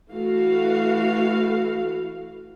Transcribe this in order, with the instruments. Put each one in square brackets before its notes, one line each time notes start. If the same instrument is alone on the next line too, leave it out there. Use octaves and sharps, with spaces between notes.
[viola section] E3 A3 F#4 F5